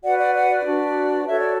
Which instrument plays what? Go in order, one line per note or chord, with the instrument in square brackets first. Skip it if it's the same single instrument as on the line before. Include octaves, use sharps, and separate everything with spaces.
[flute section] F#4 B4 D5 F#5
D5 F#5
D5 F#5
D5
D4 F#4 B4
F#4 A4 C#5 E5
D5